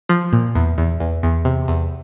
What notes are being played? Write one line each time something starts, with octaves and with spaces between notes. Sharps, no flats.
F3
A#2
E2
E2
E2
E2
C3
E2